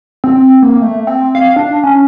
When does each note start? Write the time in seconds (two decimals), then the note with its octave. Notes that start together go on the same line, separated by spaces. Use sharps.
0.24 C4
0.62 A#3
0.82 A3
1.07 C4
1.35 F5
1.56 D4
1.84 C#4